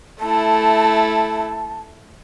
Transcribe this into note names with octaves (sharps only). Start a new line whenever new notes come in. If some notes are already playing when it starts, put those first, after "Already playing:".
A3 E4 A5